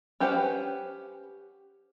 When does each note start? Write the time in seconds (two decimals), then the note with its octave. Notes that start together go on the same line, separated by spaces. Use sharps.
0.20 C#4 G4 B4 C5 F#5